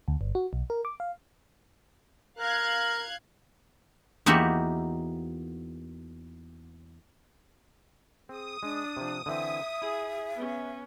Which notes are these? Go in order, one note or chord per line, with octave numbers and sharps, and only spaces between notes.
D2
G1
F#4
B1
A#4
D6
F5
A#4 F5 F#6 G#6
E2 A#3 D#4 F#4 G4 E5
C4 G#4 D#6
G#3 D4
C3 F3
D3 E3 C4 E5
E4 G#4
B3 C#4